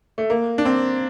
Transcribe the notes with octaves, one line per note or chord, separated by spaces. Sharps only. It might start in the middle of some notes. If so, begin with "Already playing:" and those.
A3
A#3
D4
C4